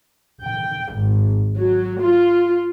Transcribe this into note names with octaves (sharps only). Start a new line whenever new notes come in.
G5
G#1
F#3
F4